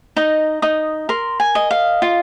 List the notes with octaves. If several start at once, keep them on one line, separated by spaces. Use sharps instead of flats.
D#4 D#5
D#4 D#6
A#4 C6
G#5
D#5
F5
F4